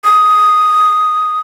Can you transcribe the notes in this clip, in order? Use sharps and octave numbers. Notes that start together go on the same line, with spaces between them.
D#6